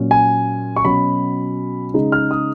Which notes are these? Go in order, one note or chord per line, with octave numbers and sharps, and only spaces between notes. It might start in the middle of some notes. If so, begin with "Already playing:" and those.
Already playing: A#2 F#3 C#4
G#5
C#6
B2 F#3 C#4 B5
C#3 G#3 D#4
F6
D#6